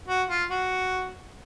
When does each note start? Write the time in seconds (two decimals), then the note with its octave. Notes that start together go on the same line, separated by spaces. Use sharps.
0.08 F#4
0.29 F4
0.51 F#4